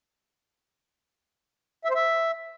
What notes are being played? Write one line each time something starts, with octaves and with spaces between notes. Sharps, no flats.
E5
C5
E5